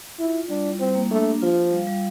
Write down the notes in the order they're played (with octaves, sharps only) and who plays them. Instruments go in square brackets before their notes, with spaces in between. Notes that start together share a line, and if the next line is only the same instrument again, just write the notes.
[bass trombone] E4 [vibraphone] F4
[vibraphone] F4
[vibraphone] G3 [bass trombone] D4
[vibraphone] E4
[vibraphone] G3 [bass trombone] C4
[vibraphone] A#3
[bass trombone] A3 [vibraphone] D4
[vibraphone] G4
[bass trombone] F3 [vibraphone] F4
[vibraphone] F5
G3
G3